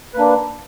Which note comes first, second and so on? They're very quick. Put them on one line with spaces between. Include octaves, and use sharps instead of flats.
B4 A#3 D4